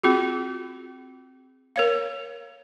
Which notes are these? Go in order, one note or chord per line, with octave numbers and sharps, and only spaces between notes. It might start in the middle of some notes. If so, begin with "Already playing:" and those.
C4 F4 F#4 G#4
A#4 C#5 F5